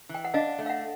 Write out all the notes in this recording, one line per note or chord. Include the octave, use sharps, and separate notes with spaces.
E3
G5
F#5
D4 D#5 F5
A3
F5
E5 F#5